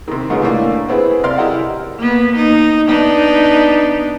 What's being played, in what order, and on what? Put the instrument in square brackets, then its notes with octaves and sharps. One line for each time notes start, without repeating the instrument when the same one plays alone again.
[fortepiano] C3 D#3
G#2 C#3 G#3 A3 B3 F4
A2 A3 A#3 D4
B3 C4 E4 G#4 B4
C3 A#4 D5 F5 C6 F6
E4 G4 G#4 A#4 D#5 F#5
[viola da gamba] A#3 B3
D#4
B3 D4 D#4